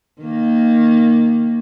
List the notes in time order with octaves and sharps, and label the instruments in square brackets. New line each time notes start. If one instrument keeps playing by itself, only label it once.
[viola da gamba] D#3 A#3